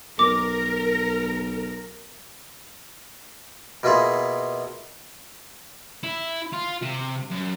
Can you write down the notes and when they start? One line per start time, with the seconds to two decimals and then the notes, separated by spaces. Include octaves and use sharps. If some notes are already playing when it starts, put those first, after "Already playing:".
0.19 B1 A#4 D6
3.83 B2 A#3 E4 F4 G#4
6.03 E4
6.52 F4
6.82 C3
7.31 F#2